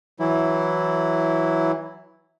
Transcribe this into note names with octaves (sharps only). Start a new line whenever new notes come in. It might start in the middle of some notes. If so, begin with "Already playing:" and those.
E3 F#3 E4